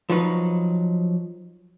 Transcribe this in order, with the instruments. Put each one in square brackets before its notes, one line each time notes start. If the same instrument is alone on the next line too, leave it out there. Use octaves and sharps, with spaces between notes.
[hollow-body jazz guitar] F3 F#3 D#4 B4